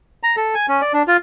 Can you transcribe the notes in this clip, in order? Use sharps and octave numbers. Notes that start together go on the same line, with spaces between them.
A#5
A4
G#5
C#4
D5
D4
F4